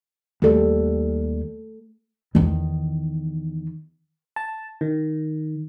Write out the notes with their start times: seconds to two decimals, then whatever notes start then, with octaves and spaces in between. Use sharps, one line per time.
0.42 D#2 G3 A3 A4
2.35 E2 D#3
4.36 A5
4.81 D#3